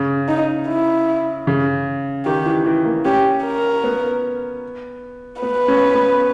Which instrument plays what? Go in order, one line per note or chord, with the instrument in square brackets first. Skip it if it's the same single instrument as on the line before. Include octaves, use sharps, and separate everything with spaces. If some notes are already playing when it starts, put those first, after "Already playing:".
Already playing: [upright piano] C#3
[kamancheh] D#4
E4
[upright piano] C#3
[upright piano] D#3 [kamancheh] G4
[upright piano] E3
E3
A#3
[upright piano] C#4 [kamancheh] G4
[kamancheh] A#4
[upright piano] B3
[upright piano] B3 [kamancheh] B4
[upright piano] C#4
B3